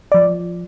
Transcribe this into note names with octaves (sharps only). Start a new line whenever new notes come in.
F3 D5